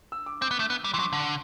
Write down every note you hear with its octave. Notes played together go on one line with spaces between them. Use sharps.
E6
D6
C4 D6
B3
A3
B3
G3
E3 C6
F#3 D6
D3